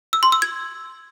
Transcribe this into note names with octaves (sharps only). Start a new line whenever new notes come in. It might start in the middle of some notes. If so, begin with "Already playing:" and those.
E6
C6
E6
G#6